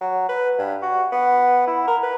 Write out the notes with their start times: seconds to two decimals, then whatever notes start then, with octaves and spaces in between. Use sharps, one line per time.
0.01 F#3
0.29 B4
0.59 G2
0.82 F#4
1.12 B3
1.67 E4
1.87 A#4
2.03 B4